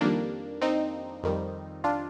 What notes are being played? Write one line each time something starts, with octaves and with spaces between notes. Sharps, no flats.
F2 D#3 G3 A#3 D4
C4 D#4
F2 D#3 G3
D4 F4